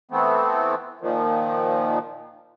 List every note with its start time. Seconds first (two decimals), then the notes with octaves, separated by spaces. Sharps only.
0.11 E3 A3 B3 C4
1.01 A#2 D#3 F3